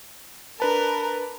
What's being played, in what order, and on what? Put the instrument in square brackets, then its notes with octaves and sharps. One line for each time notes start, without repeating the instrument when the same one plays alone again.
[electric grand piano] D4 B4 A5 [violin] A#4